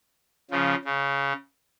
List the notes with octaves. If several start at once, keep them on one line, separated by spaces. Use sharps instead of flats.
C#3 F3
C#3